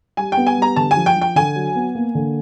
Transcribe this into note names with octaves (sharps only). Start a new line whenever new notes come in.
G3 G#5
G5
B3
G#5
G3
A#5
D3 A5
G#5
F3
G5
F3
G5
D3 G#5
F#3
B3
A#3
D3